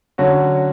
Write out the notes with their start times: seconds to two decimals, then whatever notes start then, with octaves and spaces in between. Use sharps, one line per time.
0.18 D3 F#3 C#4 F#4